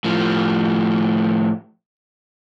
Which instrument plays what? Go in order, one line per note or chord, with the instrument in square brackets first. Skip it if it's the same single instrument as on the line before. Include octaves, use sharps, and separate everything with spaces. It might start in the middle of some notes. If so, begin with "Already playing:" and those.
[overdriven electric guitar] A2 F3